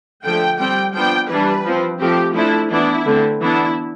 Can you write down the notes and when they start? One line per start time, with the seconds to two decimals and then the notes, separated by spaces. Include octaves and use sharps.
0.24 D3 F3 A3 G5
0.59 G3 C4 G5
0.94 F3 B3 D4 G5
1.29 E3 G3 D4 B4
1.65 F3 C4
2.00 F3 A3 C4 G4
2.35 F3 A3 D4 E4
2.71 E3 B3 D4 E4
3.06 D3 A3 C4
3.41 E3 B3 D4 E4